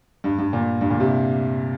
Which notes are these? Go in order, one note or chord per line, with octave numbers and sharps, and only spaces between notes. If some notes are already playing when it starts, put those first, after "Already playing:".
G2
G2
A#2
G2
A#2
C3